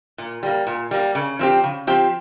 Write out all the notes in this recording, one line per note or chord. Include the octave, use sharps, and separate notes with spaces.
A#2
G3 A#3
A#2
G3 A#3
C#3
F3 C4 G4
C#3
F3 C4 G4